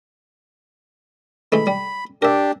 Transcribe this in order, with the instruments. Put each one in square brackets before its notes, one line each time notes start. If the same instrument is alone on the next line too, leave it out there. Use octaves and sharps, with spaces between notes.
[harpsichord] E3 G#3 A3 [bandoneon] B5
[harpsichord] G3
[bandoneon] D4 G4 [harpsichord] A#4 E5